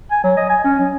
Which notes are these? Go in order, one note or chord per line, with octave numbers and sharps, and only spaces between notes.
G#5
F#3
D#5
G#5
C#4
F#3